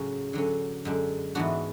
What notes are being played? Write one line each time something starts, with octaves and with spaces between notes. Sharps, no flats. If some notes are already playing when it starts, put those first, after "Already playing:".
Already playing: A2 C#3 F#3 C#4
D3 F#3 C#4
F#2 D3 G#3 D4
G#2 E3 B3 D4 F#4